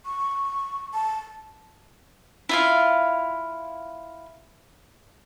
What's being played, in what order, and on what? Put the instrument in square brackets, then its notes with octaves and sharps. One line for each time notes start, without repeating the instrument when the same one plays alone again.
[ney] C#6
A5
[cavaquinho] E4 F4 F5